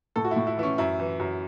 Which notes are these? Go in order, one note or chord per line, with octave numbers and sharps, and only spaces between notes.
A2 A4
F#4
E4
A2
E4
E3 E4
C#4
F#2 E4
E3
F#2